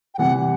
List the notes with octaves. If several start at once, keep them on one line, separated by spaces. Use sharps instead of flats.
G5
C3 E3 G3 F#5